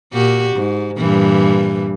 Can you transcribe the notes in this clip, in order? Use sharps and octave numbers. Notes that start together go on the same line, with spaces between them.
A#2 F#4 G4
G#2
G2 A#2 E3